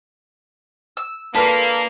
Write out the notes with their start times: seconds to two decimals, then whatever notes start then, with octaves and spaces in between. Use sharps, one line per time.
0.97 E6
1.35 A#3 D4 F4 A4 B4